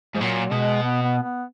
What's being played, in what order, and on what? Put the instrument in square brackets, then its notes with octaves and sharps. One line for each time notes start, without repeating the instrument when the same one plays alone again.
[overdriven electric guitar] G#2 [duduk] F3
[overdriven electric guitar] A#2 [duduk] F#3
[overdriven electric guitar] B2 [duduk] G#3
[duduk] B3
B3
B3